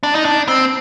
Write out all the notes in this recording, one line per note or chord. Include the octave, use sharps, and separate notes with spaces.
D4
D#4
D4
C4